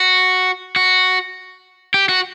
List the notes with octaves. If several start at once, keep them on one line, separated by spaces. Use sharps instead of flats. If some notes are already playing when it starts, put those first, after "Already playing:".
Already playing: F#4
F#4
G4
F#4